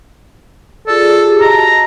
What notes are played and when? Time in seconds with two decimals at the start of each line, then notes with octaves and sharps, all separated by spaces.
0.87 F4 G#4 A4 D5
1.23 G4 G#4
1.41 F#4 D#5 A5 A#5